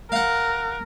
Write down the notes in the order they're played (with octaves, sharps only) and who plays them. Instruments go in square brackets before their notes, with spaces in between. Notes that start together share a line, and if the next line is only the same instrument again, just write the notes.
[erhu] A#4 [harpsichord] F5 F#5